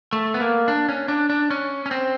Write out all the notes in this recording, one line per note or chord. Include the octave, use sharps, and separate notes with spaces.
A3
B3
A#3
D4
C#4
D4
D4
C#4
C#4
C4